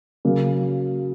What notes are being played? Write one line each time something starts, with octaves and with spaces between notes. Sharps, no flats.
C#3 F#3 A#3